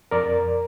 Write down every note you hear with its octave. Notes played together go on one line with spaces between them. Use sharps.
F2 A#4 D5